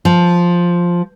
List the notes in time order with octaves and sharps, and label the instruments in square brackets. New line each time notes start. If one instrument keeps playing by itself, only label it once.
[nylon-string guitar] F3